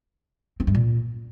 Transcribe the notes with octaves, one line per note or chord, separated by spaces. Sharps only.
C4
G2
A#2